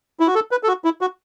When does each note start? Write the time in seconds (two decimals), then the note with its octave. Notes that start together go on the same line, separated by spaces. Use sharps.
0.20 E4
0.27 F#4
0.35 A4
0.51 B4
0.63 A4
0.68 F#4
0.84 E4
1.01 F#4